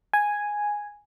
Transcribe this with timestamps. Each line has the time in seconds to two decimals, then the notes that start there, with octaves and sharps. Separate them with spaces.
0.13 G#5